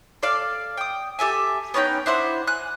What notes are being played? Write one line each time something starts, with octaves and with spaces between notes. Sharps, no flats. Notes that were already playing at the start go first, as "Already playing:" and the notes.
A4 D5 F5
G5 D#6
G4 A4 E5 G#5
B3 C#4 D#4 G5
D4 E4 C5 F#5
G#5 F#6